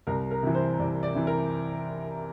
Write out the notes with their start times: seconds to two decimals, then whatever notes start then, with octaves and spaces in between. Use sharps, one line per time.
0.07 C2 A#4
0.31 A#4
0.43 C3 E3
0.55 C5
0.79 C2 D5
1.03 D5
1.15 C3 E3
1.27 A#4